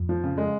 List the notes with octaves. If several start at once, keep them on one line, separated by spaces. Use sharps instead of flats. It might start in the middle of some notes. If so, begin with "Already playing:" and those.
Already playing: F2
F3
C#3
G#3